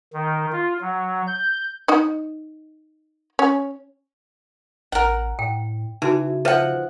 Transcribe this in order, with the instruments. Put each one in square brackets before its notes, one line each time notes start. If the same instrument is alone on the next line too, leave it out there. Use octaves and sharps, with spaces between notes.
[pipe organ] D#3
F4
F#3
G6
[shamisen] D#4 D#5
C#4
[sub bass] A1 [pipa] A#4 F#5
[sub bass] A2 [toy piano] G5
[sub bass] C#3 [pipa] E3 [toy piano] D#4 F#4
[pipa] F3 F#5 [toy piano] B4 C5 E5